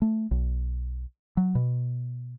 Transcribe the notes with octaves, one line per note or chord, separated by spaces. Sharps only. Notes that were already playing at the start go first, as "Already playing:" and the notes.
A3
B1
F#3
B2